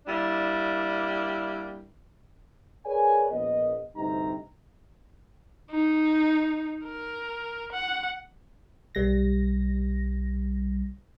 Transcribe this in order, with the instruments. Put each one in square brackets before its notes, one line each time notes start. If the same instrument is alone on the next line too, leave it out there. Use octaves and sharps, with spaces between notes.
[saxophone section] G3 A#3 D4 E4
[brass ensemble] G#4 A#4 B4 C#5 D5 G#5
A#1 B3 D#5
D2 G2 C3 D#4 G4 A#5
[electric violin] D#4
A#4
F#5
[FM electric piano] B1 G3 A#6